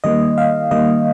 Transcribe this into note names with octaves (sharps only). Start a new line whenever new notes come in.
D#3 G3 A#3 D#5
F5
D#3 G3 A#3 D#5